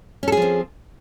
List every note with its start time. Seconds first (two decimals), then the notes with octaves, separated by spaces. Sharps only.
0.23 C#4
0.28 A4
0.32 G#4
0.37 F3
0.42 C4